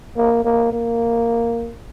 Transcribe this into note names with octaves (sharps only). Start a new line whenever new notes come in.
A#3
A#3
A#3